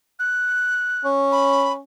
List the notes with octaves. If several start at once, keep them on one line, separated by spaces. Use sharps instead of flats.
F#6
C#4
B5